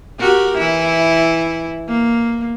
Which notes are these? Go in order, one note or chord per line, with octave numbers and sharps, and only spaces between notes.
F#4 G4 A#4
E3 E4
A#3